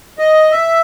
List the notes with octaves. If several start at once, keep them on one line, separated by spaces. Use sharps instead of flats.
D#5
E5